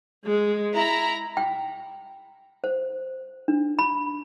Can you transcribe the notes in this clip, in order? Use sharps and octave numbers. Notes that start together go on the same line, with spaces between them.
G#3
E4 A#5
G5
C5
D4
B5